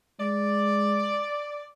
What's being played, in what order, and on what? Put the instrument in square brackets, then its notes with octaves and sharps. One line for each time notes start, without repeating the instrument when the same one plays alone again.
[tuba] G#3 [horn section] D5